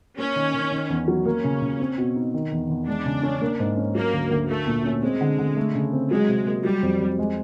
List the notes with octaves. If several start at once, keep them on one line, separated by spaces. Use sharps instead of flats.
A#3 C#4
D#3
D#3
D#3
E2
F#3
A#3 C#4
C#3
C#3
C4
B2
D#4
D#3
E2
E2
G#3 D4
C#3
C#4
A#3
G#2
C#4
F#3 A#3
D2
D2
A3 A#3
A#2
C#4
G#3 C4
D3
D3
A3
C#3
C4
F#3 G#3
C3
A#3
F#3 G3
F2
F2
G#3